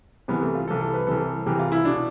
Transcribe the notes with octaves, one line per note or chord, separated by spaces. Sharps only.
C2 C3 E3 B3
A3
F4
C2 C3 E3 A4
A4
B4
C2 C3 E3 A4
C2 C3 E3 G4
F4
E4
B2 D4